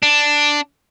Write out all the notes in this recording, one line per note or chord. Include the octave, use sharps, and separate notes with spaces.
D4